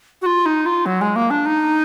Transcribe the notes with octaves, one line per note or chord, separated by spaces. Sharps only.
F#4
F4
D#4
F4
F#3
G#3
A#3
D4
D#4